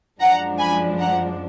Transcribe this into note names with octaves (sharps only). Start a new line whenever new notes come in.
F#2 F3 G#3 D4 F#5 A#5
G#5 B5
F#5 A#5